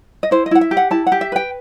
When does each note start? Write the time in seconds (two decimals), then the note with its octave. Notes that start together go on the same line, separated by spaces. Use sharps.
0.23 D#5
0.31 E4 C5
0.46 D#5
0.51 E4 F#5
0.61 E5
0.71 G4
0.77 F#5
0.91 E4 A5
1.07 F#5
1.12 G4
1.21 E5
1.32 B4 G5